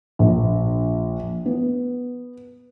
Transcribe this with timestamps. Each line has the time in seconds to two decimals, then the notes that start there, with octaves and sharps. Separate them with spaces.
0.19 A#1
1.46 B3